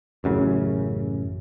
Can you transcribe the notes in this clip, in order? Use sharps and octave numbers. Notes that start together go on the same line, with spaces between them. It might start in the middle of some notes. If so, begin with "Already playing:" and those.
A1 F#2 C#3